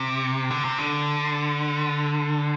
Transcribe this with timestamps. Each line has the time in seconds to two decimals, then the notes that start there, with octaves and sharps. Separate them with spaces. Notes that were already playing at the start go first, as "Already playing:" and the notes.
Already playing: C3
0.50 D3
0.64 C3
0.78 D3